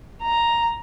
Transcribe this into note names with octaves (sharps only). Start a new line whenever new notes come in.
A#5